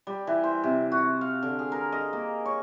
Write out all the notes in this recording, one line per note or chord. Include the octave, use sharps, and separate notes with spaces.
G3
E3
C5
C3
F#4
F5
D3
G#4
A#4
D#5
A#3
C#5